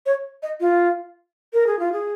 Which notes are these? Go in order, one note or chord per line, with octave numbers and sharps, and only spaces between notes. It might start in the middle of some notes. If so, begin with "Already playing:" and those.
C#5
D#5
F4
A#4
G#4
F4
G#4